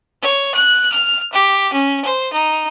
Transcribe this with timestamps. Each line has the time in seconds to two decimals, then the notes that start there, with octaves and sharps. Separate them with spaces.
0.22 C#5
0.55 F#6
0.92 F6
1.33 G4
1.73 C#4
2.05 C5
2.33 D#4